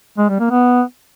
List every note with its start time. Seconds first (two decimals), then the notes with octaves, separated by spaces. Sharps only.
0.18 G#3
0.29 G3
0.40 A#3
0.51 B3